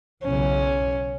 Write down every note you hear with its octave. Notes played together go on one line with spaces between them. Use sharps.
B1 E2 C#3 C#4